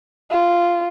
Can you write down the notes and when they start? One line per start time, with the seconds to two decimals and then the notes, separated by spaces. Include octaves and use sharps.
0.31 F4